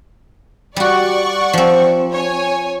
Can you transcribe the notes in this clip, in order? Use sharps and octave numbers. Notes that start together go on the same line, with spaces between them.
G3 F#4 D5 F#5 C#6
F3 C4
C#5 G#5